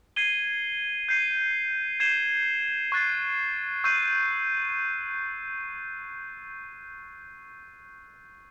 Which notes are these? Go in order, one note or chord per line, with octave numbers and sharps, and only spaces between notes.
G#6 C7 D#7 G7
G6 C7 D#7
G#6 C7 E7 G7
C#6 F#6 A6 C7
C#6 E6 G6 C7 D#7